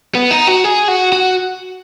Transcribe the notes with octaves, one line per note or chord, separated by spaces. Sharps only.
B3
D#4
F#4
G#4
F#4
F#4